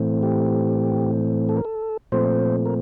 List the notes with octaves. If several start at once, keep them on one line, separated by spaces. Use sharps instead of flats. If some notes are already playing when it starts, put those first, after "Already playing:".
Already playing: A2 E3 A3 C4
G4
A4
A#4
A4
A#2 F3 A3 C4 C5
A#4